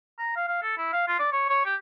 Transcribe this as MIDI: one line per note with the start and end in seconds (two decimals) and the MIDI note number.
0.19 0.34 82
0.36 0.47 77
0.48 0.59 77
0.62 0.73 69
0.78 0.89 64
0.93 1.03 77
1.08 1.16 65
1.19 1.28 74
1.32 1.48 73
1.49 1.61 73
1.66 1.75 67